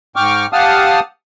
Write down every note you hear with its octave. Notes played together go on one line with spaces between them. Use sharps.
G#2 G5 C#6 D6 F6
G4 F5 F#5 A5 D#6 F6